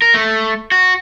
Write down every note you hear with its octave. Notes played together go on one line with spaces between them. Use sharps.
A#4
A3
F#4